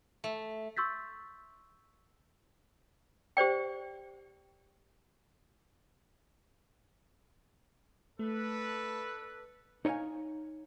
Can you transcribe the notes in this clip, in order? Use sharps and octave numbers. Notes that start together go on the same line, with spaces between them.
A3
C6 C#6 E6 G6 A6 B6
G4 C5 D5 G5
A3 D4 A4 B4
D#4 C#5 D#5 F5 G#5